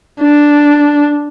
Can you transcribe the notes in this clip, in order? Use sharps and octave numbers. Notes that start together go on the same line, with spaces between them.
D4